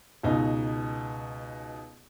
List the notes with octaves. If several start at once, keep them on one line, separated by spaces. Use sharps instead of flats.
C#2 B2 D#4